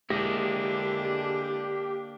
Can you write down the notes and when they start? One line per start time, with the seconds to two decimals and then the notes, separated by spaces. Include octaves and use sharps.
0.10 D3 G#3 A#3 D4 E4 G4 D#5